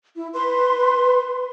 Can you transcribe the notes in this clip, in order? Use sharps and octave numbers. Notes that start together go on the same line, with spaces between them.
E4
B4 C6